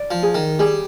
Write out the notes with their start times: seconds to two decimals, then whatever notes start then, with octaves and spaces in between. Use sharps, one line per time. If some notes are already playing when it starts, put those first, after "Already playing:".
Already playing: D5
0.11 F3
0.23 G#4
0.35 D#3
0.59 G3 G#4